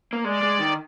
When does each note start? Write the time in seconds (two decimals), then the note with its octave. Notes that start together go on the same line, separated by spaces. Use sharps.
0.13 A#3
0.24 G#3 D5
0.43 G#3
0.60 D#3